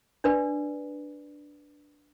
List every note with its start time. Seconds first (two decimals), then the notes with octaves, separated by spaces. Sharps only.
0.24 D4 B4 D5